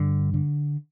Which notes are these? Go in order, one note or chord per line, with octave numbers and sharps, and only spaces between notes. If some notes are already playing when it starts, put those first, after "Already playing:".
Already playing: G2 D3
D3